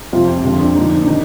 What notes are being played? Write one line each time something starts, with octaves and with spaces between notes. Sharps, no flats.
F2 C3 F3 F4
F2 D3 F3 F4
D4
A#2 F3 D#4
D4
D4
D#3 D#4